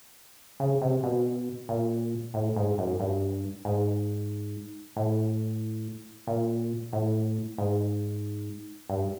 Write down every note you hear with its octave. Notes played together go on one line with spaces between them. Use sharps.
C#3
C3
B2
A#2
A2
G#2
F#2
G2
G#2
A2
A#2
A2
G#2
G2